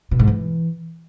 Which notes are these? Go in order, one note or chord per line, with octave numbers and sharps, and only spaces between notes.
B2
G#2
E3